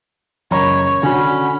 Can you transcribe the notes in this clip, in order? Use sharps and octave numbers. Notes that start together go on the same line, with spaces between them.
F#1 C#5 A#5 B5
D3 C#4 F#4 B5